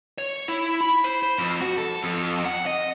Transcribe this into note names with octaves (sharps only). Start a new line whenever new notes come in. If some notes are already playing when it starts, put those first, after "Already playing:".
C#5
E4
B5
C5
C5
F2
F#4
A4
F2
F#5
D#5